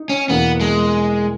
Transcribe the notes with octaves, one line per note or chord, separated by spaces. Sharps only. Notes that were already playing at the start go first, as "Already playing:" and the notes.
Already playing: D#4
C#4
E2 B2 A#3 B3
G#3